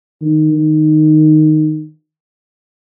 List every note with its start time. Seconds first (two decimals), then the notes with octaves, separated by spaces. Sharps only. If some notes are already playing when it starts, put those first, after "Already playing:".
0.21 D#3
0.53 D#3